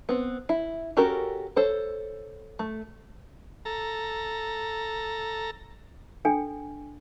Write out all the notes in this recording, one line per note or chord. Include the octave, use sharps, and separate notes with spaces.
B3 C4
E4
C#4 F#4 G4 A4 A#4
A4 C5 C#5
A3
A4 A#5
D4 A4 G5 G#5